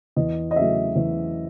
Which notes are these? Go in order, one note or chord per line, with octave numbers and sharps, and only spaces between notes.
E2 D#5
D#5
C#3 F#3 A3 E5
E2